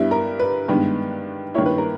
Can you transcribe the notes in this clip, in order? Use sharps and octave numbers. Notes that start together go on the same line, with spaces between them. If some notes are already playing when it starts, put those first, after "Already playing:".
Already playing: G2 G3 B3 E4 E5
A#4
B4
G2 D#3 G#3 B3
G2 D#3 A#3 E4 C#5
B4
A#4